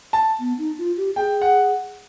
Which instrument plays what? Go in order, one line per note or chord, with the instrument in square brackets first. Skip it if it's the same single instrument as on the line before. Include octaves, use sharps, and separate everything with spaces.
[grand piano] A5
[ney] B3
D#4
F4
G4
[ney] G#4 [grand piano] G5
[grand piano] F#5